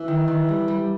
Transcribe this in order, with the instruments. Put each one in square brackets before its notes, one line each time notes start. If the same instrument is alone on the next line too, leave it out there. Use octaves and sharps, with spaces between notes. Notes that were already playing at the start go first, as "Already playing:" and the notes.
Already playing: [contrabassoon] E3
[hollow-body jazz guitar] D#3
D#3
G3
G3